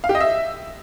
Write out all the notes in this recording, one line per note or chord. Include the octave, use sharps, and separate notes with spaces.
F5
G4
D#5
E5